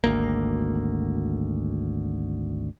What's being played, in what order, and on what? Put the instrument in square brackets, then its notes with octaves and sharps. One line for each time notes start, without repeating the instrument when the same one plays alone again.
[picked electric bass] G#1 D2 A#3